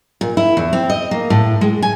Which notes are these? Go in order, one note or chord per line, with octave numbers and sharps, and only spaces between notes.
A#2
E4
E2
C4
D#5
A#3
A2
G#3
G#5